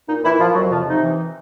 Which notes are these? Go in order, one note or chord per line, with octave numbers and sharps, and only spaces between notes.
A#2 D#4
A#2 E3 E4
A#2 F3 F4
F2 F#3 F#4
C3 F3 F4
C3 D#4
E3